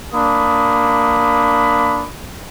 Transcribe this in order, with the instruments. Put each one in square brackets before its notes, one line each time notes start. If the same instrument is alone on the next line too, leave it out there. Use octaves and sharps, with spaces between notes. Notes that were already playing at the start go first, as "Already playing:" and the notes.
[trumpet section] A#3 D4 B5 D#6